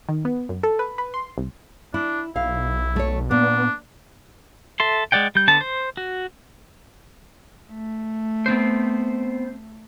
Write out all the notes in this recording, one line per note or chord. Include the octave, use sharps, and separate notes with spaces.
D#3
B3
F#2
A4
B4
B4
C6
C2
D4 E4
B1 E4 F5
A3 C#5
A#2 B3 D4
A4 E5 C6
G#3 C#5 D5 F#5 G5
G3 G6
D3 B3 A5
C5
F#4
A3
B3 C4 C5